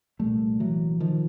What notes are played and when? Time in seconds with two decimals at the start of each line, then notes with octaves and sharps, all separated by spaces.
0.19 C2 A#2 G3 A3
0.60 E3 F#3
1.00 D#3 F3